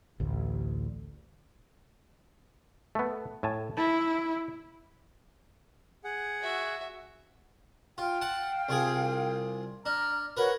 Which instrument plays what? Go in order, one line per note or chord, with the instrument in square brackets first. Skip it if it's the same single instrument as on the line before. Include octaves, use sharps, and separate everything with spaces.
[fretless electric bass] A1 D2
[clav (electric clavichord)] A3 B3
A2 G#5 A5
[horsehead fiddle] E4 [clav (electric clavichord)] A5
[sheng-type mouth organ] G#4 F#5
[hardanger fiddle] F#4 E5
[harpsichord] F4 [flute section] F5 G5
[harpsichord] F#5 A5
C2 F4 G#4
[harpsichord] D4 [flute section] A#5 F6
[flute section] F#4 C#5 [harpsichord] A#4 B4